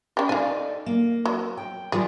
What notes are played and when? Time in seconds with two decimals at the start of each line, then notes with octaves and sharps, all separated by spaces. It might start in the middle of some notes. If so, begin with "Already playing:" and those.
0.17 C#4 G4
0.29 D#4 A4 D5 F5 G#5
0.86 A#3
1.25 F#3
1.57 G5
1.92 D#3 G3 F4 G#4